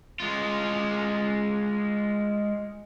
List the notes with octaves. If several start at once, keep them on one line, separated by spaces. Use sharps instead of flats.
G#3 F4